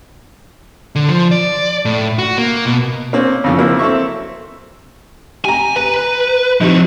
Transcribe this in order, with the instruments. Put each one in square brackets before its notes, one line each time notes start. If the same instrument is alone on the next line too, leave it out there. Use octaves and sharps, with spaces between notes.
[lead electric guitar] D3
F3
D5
A2
F#4
A#3
B2
[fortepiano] A#3 C4 C#4
F2 C#3 F3
F#3 A#3 C4 E4
C4 A4 E5 C#6
[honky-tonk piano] G4 A#5 [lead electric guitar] G#5
[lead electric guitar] B4 [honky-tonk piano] A#5
[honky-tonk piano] C3 D#4 [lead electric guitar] F3 F#4